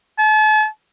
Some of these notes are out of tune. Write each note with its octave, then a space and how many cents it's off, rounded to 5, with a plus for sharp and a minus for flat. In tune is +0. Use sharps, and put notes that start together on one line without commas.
A5 -40